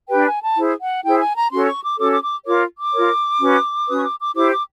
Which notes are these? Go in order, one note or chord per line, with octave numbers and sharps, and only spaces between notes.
D4 G4 B4 G5
G#5
A5
E4 G#4 C5
F#5
E4 G#4 C5 G5
G#5
A#5
C#4 F#4 A4 C#5 C6
C#6
D6
C#4 F#4 A4 C#5 D6
D6
D6
F4 A#4 C#5 D6
D6
F4 A#4 C#5
C#4 F#4 B4
C#4 F#4 B4 D#6
C#6
D6
D6
E4 G4 C5 D6
D6